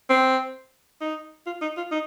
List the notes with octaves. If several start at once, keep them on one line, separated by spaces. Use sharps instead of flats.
C4
D#4
F4
D#4
F4
D#4